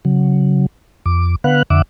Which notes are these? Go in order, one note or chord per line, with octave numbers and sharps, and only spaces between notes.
C#3 F#3
F2 D6
D3 B3 B4 F5 F#5 F#6
F2 D3 E5 F#5 D6